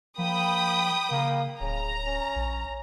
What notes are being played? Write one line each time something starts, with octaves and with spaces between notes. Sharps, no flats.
F3 A#3 G5 B5 D#6
C#3 A#3
D1 C#3 A#5
C#4
A#1